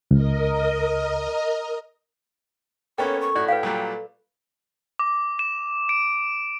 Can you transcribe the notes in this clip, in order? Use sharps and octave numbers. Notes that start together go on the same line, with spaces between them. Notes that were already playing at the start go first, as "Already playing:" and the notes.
C#2 A#4 D#5
A#3 B3 C#4 A4 C#5 G5
C#6
A2 F#4 D5
B4 F5 G5
A#2 F#3 G3
D6
E7
D7